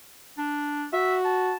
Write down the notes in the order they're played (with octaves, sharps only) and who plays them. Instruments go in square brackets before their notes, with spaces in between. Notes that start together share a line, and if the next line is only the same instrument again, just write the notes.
[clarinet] D4
[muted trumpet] F#4 [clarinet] E5
[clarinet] A5